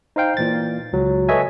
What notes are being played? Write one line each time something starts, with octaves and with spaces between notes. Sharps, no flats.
D#4 C5 F5 G5
A#2 E3 A6
C#2 F#3
A4 B4 C#5 D#5 E5 G#5